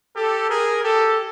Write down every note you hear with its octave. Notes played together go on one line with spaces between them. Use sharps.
G4 A4
G#4 A#4
G4 A4